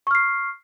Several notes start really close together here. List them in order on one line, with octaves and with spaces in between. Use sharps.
C#6 F6 C7